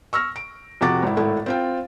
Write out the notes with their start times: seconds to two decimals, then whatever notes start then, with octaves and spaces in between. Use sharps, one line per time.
0.13 C#6 E6 F6 A#6
0.36 D7
0.81 F2 C3 F#4 D6 A6
1.03 G#1 E4
1.17 G#1 A2 A3 E4
1.46 C4 F4 G5